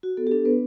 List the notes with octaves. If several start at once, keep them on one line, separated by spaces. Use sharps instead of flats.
F#4
B3 A4
G4
D4 A4
B3 B4